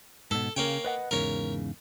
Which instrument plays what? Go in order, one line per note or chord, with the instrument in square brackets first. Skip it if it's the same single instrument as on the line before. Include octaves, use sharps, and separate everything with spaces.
[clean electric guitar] G#2 B2 [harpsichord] A4
[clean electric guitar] C#3 [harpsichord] A#3 C#5 G5
[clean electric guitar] B4 D#5 F#5
[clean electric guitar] E2 G#2 C#3 [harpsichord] A#4 C#5